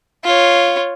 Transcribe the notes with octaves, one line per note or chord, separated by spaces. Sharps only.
F4 C#5